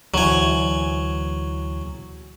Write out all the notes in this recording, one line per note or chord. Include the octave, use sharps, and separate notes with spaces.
D2 E3 F#3 G#5